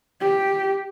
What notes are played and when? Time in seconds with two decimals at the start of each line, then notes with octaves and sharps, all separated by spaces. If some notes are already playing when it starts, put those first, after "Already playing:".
0.21 G4